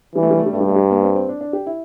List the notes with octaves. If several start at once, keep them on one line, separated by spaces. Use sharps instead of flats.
E3 G3
A3
G3
A3
G3
G2 A3
G3
A3
G3
A#3
C4
C4
D4
D4
G4
E4